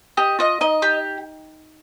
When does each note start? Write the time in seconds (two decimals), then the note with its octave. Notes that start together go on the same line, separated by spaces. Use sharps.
0.17 G4 D#5
0.39 F4 D#5
0.61 D#4 D#5
0.82 G4